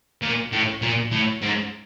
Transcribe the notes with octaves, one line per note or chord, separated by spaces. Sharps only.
A#2
A2
A#2
A2
G#2